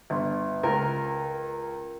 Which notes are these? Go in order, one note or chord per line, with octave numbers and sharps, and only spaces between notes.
G1
C#2 A#4